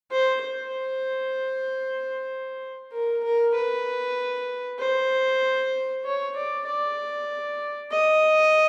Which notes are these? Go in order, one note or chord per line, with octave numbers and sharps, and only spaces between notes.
C5
C5
A#4
A#4
B4
C5
C#5
D5
D5
D#5